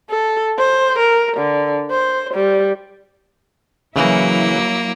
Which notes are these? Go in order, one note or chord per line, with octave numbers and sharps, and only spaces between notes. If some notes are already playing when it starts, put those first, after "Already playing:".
A4
C5
A#4
D3
C5
G3
C#3 E3 F#3 A#3 E4